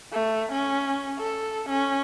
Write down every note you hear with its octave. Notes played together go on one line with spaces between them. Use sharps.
A3
C#4
A4
C#4